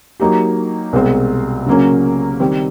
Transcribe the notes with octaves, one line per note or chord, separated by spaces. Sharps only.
F#3 A#3 D#4 G4
C2 B2 G#3 C4
C#3 F#3 A#3 C#4
D#3 G3 C4